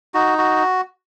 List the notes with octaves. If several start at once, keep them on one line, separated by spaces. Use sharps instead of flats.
D#4 F#4
F#4